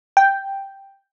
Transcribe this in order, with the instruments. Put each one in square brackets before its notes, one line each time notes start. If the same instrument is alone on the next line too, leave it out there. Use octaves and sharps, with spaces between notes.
[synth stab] G5